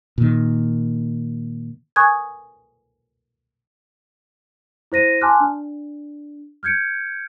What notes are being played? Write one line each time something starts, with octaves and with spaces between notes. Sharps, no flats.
A#2 D#3
G#5 C#6 D#6 F#6 G#6
E4 C5 A#6 D#7
G#5 A5 C6 D6 F6 F#6
D4
F6 G6 G#6 C#7 D7